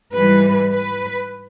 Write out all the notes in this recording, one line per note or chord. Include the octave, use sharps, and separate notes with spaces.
G#2 E3 G3 B4
B4